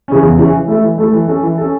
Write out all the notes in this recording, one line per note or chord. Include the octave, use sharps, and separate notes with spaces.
C#3 E3 C#4
E2
C#3 E3 C#4
E3
A3 E4 A4
E3
A3 E4 A4
E3
C#4 A4
E3
C#4 A4